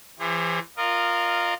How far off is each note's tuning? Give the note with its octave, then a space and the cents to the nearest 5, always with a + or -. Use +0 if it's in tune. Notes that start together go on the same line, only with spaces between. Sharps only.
E3 +30 G#4 -45 C5 +45
F4 +0 A#4 +0 D#5 -35